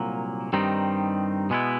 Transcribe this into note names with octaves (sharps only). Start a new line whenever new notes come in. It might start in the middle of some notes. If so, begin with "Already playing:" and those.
Already playing: C2 A#2 F#3 A#3
G2 D#3 G3 C4 D#4
B2 G#3 B3 E4